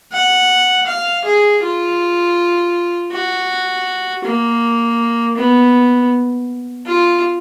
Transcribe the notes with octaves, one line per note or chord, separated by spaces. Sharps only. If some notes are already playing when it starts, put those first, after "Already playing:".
F#5
F5
G#4
F4
F#4
A#3
B3
F4